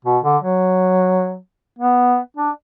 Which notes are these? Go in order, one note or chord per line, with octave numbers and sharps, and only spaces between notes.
B2
D3
F#3
B3
D4